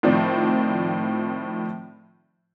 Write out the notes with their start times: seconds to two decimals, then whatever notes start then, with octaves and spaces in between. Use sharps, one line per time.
0.03 A2 D#3 F3 C4 D5